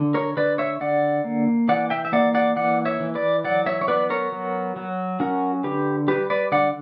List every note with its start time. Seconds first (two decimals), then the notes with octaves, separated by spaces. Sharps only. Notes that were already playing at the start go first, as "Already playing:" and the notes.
Already playing: D3
0.14 A#4 C#5
0.37 D3 B4 D5
0.58 C#5 E5
0.81 D3 D5 F#5
1.24 A#3
1.68 E3 D5 F#5
1.90 E5 G5
2.05 E5
2.12 A#3 D5 F#5
2.34 D5 F#5
2.56 E3 D5 F#5
2.85 C#5 E5
3.00 E3
3.15 B4 D5
3.44 F#3 D5 F#5
3.66 C#5 E5
3.81 C#5
3.88 B3 B4 D5
4.10 A#4 C#5
4.32 F#3
4.76 F#3
5.20 C#4 F#4 A#4
5.64 D3 G4 B4
6.08 G3 G4 B4
6.30 B4 D5
6.52 D3 D5 F#5